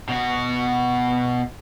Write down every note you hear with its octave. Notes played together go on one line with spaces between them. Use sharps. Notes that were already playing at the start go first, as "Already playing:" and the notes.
B2 F#4